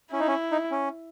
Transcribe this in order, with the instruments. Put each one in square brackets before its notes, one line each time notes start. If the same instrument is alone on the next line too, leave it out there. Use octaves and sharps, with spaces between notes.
[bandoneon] C#4 [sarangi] E4
[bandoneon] D#4
C#4
D#4
C#4